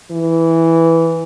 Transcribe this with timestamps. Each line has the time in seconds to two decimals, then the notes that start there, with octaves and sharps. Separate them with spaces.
0.12 E3